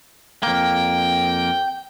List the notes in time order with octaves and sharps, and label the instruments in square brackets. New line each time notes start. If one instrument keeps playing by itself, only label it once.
[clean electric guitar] F2 A#3 [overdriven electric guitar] G5